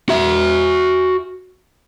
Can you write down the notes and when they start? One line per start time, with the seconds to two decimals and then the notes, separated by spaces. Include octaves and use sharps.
0.09 F#4 E5